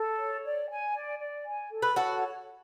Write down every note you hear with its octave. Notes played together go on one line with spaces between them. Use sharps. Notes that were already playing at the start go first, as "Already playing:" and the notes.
Already playing: A4
C#5
D5
G#5
D5
D5
G#5
A4
B4
F#4 A4 C#5